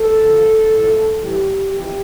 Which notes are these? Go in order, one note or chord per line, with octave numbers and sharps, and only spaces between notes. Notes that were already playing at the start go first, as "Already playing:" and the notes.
Already playing: A4
D2 D3 F3
A2 F3
A2 E3 G3 G4
F2 E3 G4